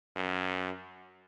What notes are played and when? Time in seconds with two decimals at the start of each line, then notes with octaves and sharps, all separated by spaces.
0.16 F#2